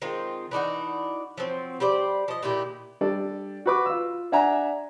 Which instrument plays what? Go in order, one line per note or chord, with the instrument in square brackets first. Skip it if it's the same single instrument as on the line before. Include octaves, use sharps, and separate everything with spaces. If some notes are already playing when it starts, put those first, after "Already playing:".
[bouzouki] D#3 G#3 C4 F4
E3 D4 D#4 F#4
F3 F#3 C4
G3 G4 C5 D5
F3 D#5
A#2 D#3 E4 G4
[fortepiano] G3 D4 A4 D5
F#4 B4 D6
F4 E6
D4 E5 F#5 G#5 A#5